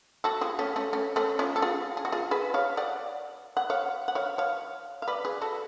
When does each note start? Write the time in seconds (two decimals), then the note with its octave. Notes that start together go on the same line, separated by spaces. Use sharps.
0.24 F#4 A4
0.41 F4 G#4
0.59 A3 C#4
0.76 A3 C#4
0.93 A3 C#4
1.16 A3 C#4
1.39 C#4 F4
1.56 A4
1.62 F4 G#4
1.97 G#4
2.05 F#4
2.12 F4 G#4
2.31 G#4 B4
2.54 C#5 F5
2.77 D5 F#5
3.57 F#5
3.70 C#5 F5
4.08 F#5
4.15 C#5 F5
4.38 C#5 F5
5.02 F5
5.08 B4 D5
5.25 G#4 B4
5.41 F#4 A4